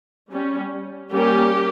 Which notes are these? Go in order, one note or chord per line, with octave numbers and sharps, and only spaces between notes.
G3 C#4
G3 A#3 C#4 G4